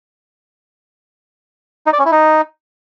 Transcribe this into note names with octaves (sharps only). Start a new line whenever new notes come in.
D#4
D5
C#4
E4
D#4